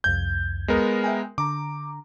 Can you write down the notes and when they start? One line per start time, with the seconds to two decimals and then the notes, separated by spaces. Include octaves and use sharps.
0.04 C2 F2 G6 G#6
0.68 G#3 B3 A#4
1.04 E5 G5 G#5
1.38 D3 A#5 D6